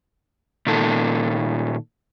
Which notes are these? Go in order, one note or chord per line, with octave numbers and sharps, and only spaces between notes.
A#2 D#3 A4